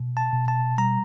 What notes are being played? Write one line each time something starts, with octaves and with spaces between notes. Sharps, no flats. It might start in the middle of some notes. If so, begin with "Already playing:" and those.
Already playing: B2
A5
B2
A5
G3 A#5